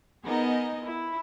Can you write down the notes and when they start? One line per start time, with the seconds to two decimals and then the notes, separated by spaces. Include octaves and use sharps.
0.24 B3 D#4 G#4 A#4 D#5
0.86 E4